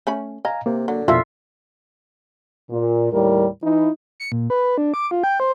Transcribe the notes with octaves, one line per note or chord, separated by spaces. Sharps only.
A3 C#4 B5
D#5 F5 G#5 A#5
C3 A#3
D3 F#3
F2 B2 E3 F3 A#3 F4 E5
A#2
D#2 A2 G3 A#4
E3 D#4 E4
C#7
A#2
B4
D4
D6
F4
G5
C5